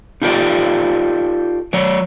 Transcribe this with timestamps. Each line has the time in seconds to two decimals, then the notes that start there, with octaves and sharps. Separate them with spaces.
0.22 D#4 F4 G4 A4 D5
1.73 F#3 C#5 D5